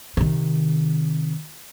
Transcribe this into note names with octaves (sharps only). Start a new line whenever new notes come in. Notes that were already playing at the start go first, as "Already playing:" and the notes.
C3 D#3